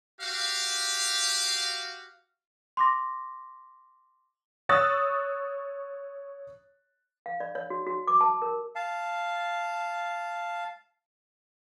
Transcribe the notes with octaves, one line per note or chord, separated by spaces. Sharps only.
F#4 G4 F5
C6 D6 A#6
C#5 C#6 D#6 E6 F#6 A6
F5
D5
C#5
F#4
F#4
D6
A5
A#4
F5 A5